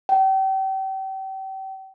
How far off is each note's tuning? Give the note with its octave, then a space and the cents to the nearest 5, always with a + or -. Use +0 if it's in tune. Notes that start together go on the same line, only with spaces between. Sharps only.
G5 -35